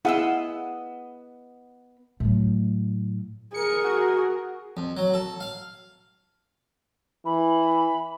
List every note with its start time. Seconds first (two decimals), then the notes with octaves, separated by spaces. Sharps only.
0.05 B3 E4 G#4 D#5 F5 F#5 E6
2.20 A2 F#3
3.54 G#4 A#4 C#7
3.84 F#4
4.77 F2
4.97 F#3
5.14 A4
5.41 F5
7.25 E3 B5